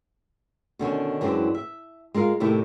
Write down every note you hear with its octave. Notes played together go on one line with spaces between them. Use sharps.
B2 D3 D#3 C#4
F#2 E3 G#3 C4 D4
E5
G#3 F4 A#4 F5
A2 C3 D#3 A3 E4 G4